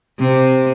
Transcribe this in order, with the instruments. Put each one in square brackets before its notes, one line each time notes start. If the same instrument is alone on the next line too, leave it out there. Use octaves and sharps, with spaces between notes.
[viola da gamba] C3